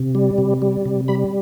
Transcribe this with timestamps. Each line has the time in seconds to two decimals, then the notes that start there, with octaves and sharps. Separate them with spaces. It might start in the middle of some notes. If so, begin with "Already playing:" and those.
Already playing: C3
0.15 G3
0.38 C3
0.62 G3
0.86 C3
1.08 G3 B5